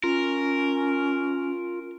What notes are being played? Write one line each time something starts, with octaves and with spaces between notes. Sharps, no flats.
C#4 F4 A#4